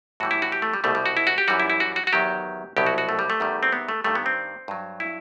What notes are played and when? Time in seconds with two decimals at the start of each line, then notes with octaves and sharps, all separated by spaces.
0.20 A2 E3 G3 F#4
0.31 E4
0.42 F#4
0.52 G4
0.62 A3
0.74 G3
0.84 C2 B2 G3 A3
0.95 G3
1.06 F#4
1.17 E4
1.27 F#4
1.38 G4
1.48 F#2 E3 G3 F#4
1.60 E4
1.70 E4
1.80 F#4
1.96 F#4
2.07 F#4
2.13 E2 D#3 F#3 G4
2.77 C2 B2 F#3 G4
2.87 F#4
2.98 F#4
3.09 A3
3.19 G3
3.30 A3
3.40 E2 D#3 G3
3.63 C4
3.73 B3
3.89 A3
4.04 G2 D#3 G3 A3
4.15 B3
4.26 C4
4.68 G2 F#3
5.00 E4